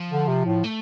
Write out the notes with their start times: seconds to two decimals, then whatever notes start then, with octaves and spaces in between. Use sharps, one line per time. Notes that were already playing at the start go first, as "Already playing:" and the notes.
Already playing: F3
0.10 D3
0.28 C3
0.46 A2
0.64 A3